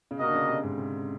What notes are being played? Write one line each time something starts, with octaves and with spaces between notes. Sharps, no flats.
C#3
C3 A#3 D4 F#4 A#4 D#5
D3
C#3
C3
G#2
C3